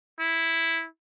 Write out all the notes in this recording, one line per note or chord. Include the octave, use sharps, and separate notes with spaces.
E4